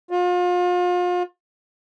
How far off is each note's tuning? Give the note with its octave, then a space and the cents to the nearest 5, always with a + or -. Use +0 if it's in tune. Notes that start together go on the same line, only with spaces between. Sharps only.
F4 +35